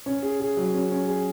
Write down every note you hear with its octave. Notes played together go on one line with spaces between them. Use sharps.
C#4
G#4
G#4
F#3
C#4
C#4
G#4